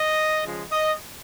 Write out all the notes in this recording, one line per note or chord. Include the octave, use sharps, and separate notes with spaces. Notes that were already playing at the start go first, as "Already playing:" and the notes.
Already playing: D#5
C#3 F3 G#3
D#5